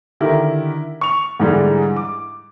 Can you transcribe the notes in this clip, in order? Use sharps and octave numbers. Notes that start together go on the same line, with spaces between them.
D3 D#3 E4 G4 A#4
C#6 F7
G#2 D3 E3 G3 G#3
D6